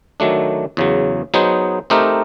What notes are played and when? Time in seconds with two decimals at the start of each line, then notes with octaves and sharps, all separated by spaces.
0.20 D#3 F#3 A3 D4
0.77 E2 C#3 F#3
1.34 F#3 B3 D#4 G#4 C5
1.90 A3 C4 D#4 G4 A#4